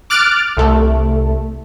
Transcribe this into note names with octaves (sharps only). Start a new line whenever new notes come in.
D6 F6 F#6 A6 D7
C2 A3